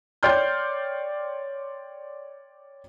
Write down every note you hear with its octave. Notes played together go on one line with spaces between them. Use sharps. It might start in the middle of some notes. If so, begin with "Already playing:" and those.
C#5 D5 G5 C6 F6 G6